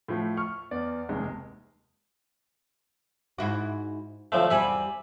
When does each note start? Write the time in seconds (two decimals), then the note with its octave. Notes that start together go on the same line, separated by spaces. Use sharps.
0.08 A2 F3 A3
0.37 C#6 F6
0.71 E2 D5
1.09 F1 D#2 C3 G#3
3.38 G#2 E4 F#4
4.32 D2 F3 A3 C4
4.50 E2 G3 C4 E5 G#5 B5